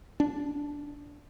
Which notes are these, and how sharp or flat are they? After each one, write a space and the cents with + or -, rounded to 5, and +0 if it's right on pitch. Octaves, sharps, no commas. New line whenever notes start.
D4 -15